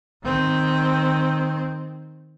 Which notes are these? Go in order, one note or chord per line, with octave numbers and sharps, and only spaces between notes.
D#3 C4